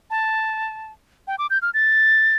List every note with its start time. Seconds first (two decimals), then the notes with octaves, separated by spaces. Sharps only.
0.10 A5
1.27 G5
1.39 D6
1.50 G6
1.62 F6
1.74 A6